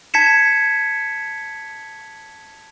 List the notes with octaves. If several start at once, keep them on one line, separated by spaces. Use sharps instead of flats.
A5 G#6 B6 C#7 E7